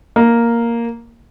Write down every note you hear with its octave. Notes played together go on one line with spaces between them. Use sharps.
A#3